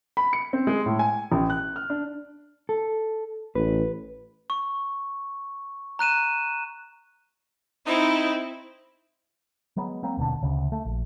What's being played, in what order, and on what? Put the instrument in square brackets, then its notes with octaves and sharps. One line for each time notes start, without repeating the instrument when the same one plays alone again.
[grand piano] B5
C#7
C4
G#3
A2
G#5
A1
F#6
F6
D4
[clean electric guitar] A4
[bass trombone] A1 [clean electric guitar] B4
[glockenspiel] C#6
A#5 F#6 D#7 E7
[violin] C4 E4 [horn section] D#4
[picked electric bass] F#3 G#3 B3
F#3 A#3 C4
D#1 B2 D3 D4
D2 C#3
A3
A#1